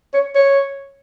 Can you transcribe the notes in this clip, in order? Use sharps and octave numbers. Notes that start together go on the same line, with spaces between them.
C#5
C#5